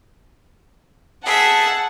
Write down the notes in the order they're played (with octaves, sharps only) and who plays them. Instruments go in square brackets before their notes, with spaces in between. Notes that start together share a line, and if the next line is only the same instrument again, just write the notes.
[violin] G#4 E5 [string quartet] F#5 A5